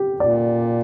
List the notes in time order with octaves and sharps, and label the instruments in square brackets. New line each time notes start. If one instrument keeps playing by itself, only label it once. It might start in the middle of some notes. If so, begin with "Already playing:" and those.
Already playing: [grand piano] G4
[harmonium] A#2 [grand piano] D5